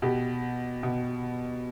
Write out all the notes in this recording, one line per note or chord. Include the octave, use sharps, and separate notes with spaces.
B2 G4
B2